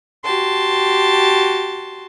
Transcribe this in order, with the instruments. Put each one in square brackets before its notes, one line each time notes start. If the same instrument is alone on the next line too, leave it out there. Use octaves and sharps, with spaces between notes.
[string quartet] F#4 G4 A5 C6